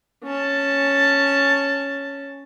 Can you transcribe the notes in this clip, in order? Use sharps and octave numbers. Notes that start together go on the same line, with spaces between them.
C#4 A5